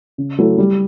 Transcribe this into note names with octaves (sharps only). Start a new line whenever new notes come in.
C#3
F#3 A3 E4 A4
G3